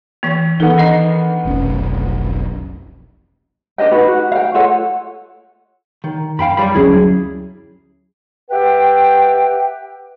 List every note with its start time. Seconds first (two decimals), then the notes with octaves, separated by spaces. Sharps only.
0.23 E3 A#3
0.60 D#3 E3 B3 A4
0.78 D4 D#4 D#5
1.45 F1 B1 C#4
3.78 D4 B4 D#5 G5
3.91 D#4 F#4 B4
4.08 F#4
4.32 F5 G5
4.54 F4 A4 C#5 F#5
6.04 D#3
6.39 F#2 F5 G5 B5
6.57 G3 B5
6.74 D2 F#3 C#4 E4 G#4
8.50 G4 B4 E5 F#5 G5